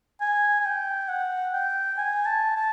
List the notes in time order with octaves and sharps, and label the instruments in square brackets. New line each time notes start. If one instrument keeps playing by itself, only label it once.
[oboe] G#5
G#5
G5
F#5
G5
G#5
A5
A5